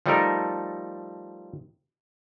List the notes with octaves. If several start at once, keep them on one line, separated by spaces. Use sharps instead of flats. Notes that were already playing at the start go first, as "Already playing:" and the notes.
F3 G3 A3 D#4 A4 A#4